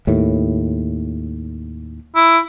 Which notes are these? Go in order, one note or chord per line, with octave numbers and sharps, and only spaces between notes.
D#2 A2
E4